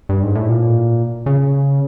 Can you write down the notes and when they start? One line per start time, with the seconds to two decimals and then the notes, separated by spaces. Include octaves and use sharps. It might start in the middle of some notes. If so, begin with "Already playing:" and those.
0.09 G2
0.23 G#2
0.35 A2
0.48 A#2
1.26 C#3